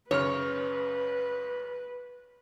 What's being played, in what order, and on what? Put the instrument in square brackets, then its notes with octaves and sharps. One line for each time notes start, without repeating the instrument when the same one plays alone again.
[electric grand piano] F#2 C#3 F6 [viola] B4 [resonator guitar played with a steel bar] C#5